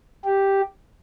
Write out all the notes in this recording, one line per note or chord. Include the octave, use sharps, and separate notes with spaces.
G4